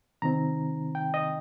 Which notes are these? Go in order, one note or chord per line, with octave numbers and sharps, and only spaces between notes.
C3 D#3 C4 D#4 A#5
G5
D#5